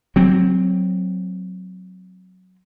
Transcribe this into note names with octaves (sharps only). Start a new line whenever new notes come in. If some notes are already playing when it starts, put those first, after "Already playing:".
F#3 C4